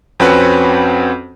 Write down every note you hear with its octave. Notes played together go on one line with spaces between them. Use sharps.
F2 C4 C#4 F#4 B4 F#5